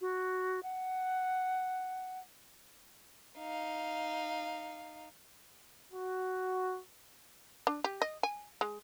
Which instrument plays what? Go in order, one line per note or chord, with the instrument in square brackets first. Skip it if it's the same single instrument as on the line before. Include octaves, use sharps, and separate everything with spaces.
[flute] F#4
F#5
[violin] D#4 F5
[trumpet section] F#4
[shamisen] D4
G4
D#5
G#5
G#3